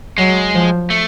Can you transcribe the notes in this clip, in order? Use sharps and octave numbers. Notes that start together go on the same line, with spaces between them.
F#3 G#3
F3
A3